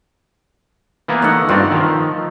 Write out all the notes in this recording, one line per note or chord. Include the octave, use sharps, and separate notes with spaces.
E3 A#3 B3
A3 D#4 F#5
G2 C4 F4 D5
D#3 F3